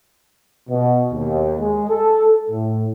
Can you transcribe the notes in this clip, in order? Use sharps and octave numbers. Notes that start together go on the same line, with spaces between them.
B2
D#2
G#3
A4
A2